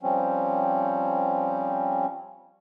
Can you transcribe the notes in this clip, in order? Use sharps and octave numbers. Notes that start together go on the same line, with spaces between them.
F3 G3 C4 C#4